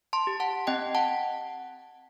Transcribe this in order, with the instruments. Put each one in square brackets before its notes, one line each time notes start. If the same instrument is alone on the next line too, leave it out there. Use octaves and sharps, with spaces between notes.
[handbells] A5 C6
G4
F#5 A5
C4 D#5 G5
F#5 A5